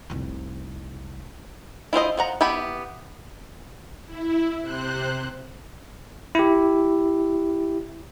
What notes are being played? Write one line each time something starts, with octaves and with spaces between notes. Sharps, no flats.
F1 C2
E4 F4 C5 D#5
F3 F#5 A#5
B3 E4 G4 G5 B5
E4
C3 C5 F#6
E4 G4